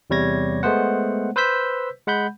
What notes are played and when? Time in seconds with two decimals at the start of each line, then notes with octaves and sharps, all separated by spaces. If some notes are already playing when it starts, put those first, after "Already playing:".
0.10 E2 C3 G3 C#5 G#6 A#6
0.63 G#3 A3 B3 C5 F#5
1.36 B4 C5 E6 G6 B6
2.07 G#3 F#5 B5 G6